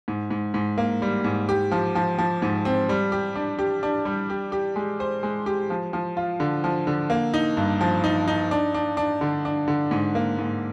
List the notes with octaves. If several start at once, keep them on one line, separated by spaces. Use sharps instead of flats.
G#2
G#2
G#2
A#3
G3
G#2
G4
F3
F3
F3
G#2
C4
G3
G4
D4
G4
D4
G3
G4
G4
G#3
C5
G#3
G4
F3
F3
F4
D3
F3
D3
A#3
D#4
G2
F3
D#4
D#4
D4
D4
D4
D3
D4
D3
G#2
A#3
G#2